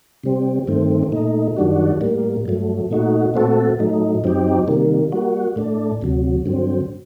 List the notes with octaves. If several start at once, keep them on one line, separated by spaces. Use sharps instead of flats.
C3 G3 C4
G2 D#3 A3 C4
A#2 A3 D#4
F#2 D#3 G3 D4 F#4
A2 G3 A#3
G2 F#3 A3
A#2 A3 D#4 F#4
A#2 A3 C4 F#4 A4
A2 F#3 A3 D#4
F#2 F#3 C4 D#4 G4
C3 D#3 G3 A#3
G3 A#3 F#4
A2 A3 D4
D2 C3 F#3
G2 D3 F#3 C4